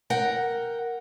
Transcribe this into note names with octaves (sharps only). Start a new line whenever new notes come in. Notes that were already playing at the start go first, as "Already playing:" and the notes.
A#4 F#5 G5